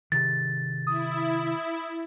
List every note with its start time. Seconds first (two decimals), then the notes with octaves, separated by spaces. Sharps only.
0.12 C3 D#3 A6
0.87 E4 D#6